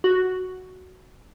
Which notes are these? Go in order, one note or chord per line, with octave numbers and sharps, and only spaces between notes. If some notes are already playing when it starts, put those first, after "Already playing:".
F#4